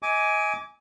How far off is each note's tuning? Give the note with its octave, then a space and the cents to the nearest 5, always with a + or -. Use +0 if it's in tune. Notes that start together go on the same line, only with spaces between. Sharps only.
D#5 +35 G#5 +5 D6 -20